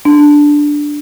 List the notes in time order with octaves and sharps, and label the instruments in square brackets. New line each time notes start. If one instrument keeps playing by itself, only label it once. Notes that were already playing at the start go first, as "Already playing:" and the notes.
[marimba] D4